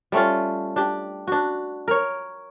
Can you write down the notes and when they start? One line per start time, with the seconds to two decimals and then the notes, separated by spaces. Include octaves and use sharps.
0.12 G3 A3 C#4 F4
0.76 D4 G4
1.27 D4 F#4
1.88 A#4 C#5